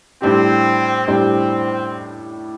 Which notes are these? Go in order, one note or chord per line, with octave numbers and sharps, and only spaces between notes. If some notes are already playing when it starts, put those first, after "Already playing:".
A2 G3 C4 D4 G4
A2 G3 C4 D4 G4